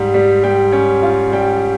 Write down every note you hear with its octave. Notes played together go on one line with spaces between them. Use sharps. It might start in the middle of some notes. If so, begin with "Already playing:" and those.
Already playing: G#2 G3
G3
G3 G5
C#4
F4
G3 G5